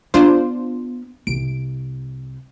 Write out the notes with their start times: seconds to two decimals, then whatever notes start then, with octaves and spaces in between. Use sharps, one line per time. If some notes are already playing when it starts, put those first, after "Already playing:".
0.14 B3 D4 F4 C5
1.27 C2 D7